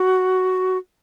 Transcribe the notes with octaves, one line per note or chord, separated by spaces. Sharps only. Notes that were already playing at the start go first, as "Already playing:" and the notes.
Already playing: F#4